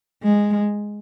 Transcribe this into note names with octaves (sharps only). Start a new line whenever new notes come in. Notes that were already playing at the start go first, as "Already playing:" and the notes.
G#3